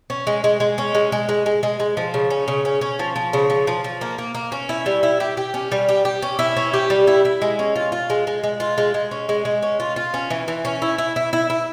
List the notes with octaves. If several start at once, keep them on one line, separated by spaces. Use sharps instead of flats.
C#4
G#3
G#3
G#3
C#4
G#3
G#3
G#3
G#3
G#3
G#3
F3
C#3
C#4
C#3
C#4
C#4
F3
F3
C#3
F3
F3
F3
A#3
A#3
A#3
C#4
E4
G3
E4
G4
G4
C#4
G3
G4
G4
C#4
E4
C#4
G4
G3
E4
E4
G#3
C#4
F4
F4
G#3
G#3
G#3
F4
G#3
G#3
C#4
G#3
G#3
C#4
F4
F4
C#4
E3
E3
C#4
E4
E4
E4
E4
E4